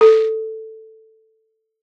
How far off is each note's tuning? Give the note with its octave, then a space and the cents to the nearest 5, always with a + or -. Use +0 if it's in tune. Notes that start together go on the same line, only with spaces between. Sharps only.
A4 +5